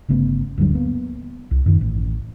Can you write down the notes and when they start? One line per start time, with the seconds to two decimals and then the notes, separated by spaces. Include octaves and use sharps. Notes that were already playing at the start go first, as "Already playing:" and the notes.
0.09 G1 C#3 A3 B3
0.58 D1 G2 D3 F#3
0.75 A#3 B3
1.51 C2
1.66 F#2 D#3
1.81 A1